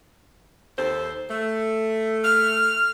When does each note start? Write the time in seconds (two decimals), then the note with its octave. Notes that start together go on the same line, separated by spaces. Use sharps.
0.77 D#2 A4 C5
1.30 A3
2.24 F6